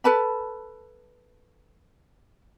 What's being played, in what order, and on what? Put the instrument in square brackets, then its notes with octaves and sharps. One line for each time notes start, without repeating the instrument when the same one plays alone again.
[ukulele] A4 B4 A5 B5